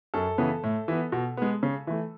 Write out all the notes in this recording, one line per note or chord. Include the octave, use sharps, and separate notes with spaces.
F#2 A4
C#3 E3 B3
A2
E3 B3
B2
G#3 B3
C#3
E3 A3